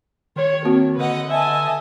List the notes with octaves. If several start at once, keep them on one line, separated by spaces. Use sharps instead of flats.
D#3 C#5
A#3 C4 F#4
D3 B4 D#5 F#5
D#5 E5 G#5 A5